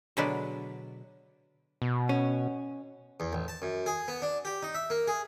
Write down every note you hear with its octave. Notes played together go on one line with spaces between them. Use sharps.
B2 D3 F#3 G#3 B4 D5
B2
C#4
E2
A1
A5
F#2
G#4
B3
D4
G4
D#4
E5
A#3
G#4